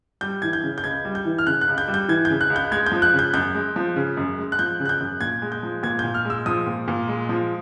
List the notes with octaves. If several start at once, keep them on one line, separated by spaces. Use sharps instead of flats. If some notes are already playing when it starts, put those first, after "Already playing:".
G3 G6
E3 G#6
G6
C#3
G6
C#2 G#6
G3
G6
E3
F6
C#3 F#6
F#6
C#2
G6
G3
G6
E3 G#6
G6
C#3
F#6
C#2
G6
G#3 G#6
G6
F3
F#6
C#3
G6
F#2 G6
G#3
F3
C#3
F#2
G#3
F#6
F3 G6
C#3
F#6
G6
F#2
A#2 G#6
G#3
G6
F3
A#2 G#6
A#2 G6
F6
G#3 E6
F3 D#6
A#2
A#2
G#3
F3